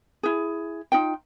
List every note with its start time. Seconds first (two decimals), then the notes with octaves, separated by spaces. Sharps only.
0.23 E4 G#4
0.92 D#4 F4 G5